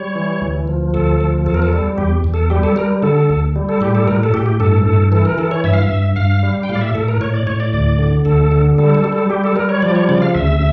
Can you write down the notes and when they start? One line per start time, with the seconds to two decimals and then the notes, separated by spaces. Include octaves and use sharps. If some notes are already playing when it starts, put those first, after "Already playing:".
Already playing: G3 C#5
0.15 E3
0.42 D2
0.68 F3
0.94 D2 A4
1.21 F3
1.46 E2 A4
1.54 A#4
1.62 A4
1.73 G3
1.98 E2 G4
2.24 E2
2.34 A4
2.50 G3 G4
2.63 A4
2.76 G3 A#4
3.03 D3 A4
3.30 D2
3.56 G3
3.69 A4
3.81 A2 G4
3.95 A4
4.07 A2 A#4
4.23 A4
4.34 A2 G4
4.46 G4
4.60 G2 A4
4.85 G2 A4
5.12 E3 A4
5.25 A#4
5.38 E3 A4
5.51 C#5
5.64 G2 E5
5.73 F5
5.83 E5
5.90 G2
6.16 G2 F5
6.43 G3
6.63 G5
6.69 A2 F5
6.75 D5
6.81 E5
6.95 A2 A4
7.08 A#4
7.21 A2 C#5
7.34 D5
7.47 A2 C#5
7.60 D5
7.73 D2 D5
7.99 D3
8.25 D2 A4
8.51 D3
8.78 G3 A4
8.95 A4
9.04 G3
9.12 A4
9.30 G3 G4
9.44 A4
9.56 G3 A#4
9.69 C#5
9.82 F3 D5
9.95 C#5
10.09 C#3 D5
10.22 F5
10.35 D2 E5